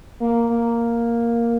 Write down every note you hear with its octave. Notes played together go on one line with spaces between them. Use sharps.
A#3
A#3